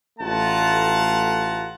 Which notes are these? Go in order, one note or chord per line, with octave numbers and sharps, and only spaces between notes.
A1 A3 F4 F#5 A5 A#5